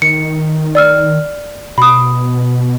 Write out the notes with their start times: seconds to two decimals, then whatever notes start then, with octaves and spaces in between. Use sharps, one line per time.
0.02 D#3 C#7
0.75 D5 E6 F6
1.78 B2 B5 D#6